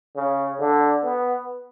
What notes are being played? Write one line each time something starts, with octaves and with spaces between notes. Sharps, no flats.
C#3
D3
B3